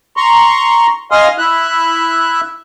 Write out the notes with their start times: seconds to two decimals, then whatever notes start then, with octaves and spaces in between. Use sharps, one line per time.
0.17 A#5 C6 C#6
1.11 D#5 F5 G#5 C6 D#6 F6
1.38 E4 E5 F#6